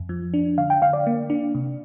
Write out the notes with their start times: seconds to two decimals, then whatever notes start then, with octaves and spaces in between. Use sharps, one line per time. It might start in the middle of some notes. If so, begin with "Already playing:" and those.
Already playing: F2
0.09 F3
0.34 D4
0.58 D3 F5
0.70 G5
0.82 D3 F5
0.93 D5
1.07 A#3
1.30 D4
1.55 C3